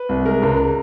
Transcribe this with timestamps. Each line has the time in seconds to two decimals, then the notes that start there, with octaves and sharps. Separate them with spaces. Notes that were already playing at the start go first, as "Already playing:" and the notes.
Already playing: B4
0.09 C2
0.25 G#3 A#4
0.43 C#2